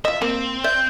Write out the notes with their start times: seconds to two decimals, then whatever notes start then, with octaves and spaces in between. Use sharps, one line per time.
0.05 F4 D#5 E5
0.22 A#3 C4
0.64 D5 E5 G6